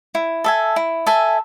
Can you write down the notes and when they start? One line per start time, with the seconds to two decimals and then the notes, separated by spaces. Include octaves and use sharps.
0.15 E4
0.44 A4 E5 G#5
0.76 E4
1.07 A4 E5 G#5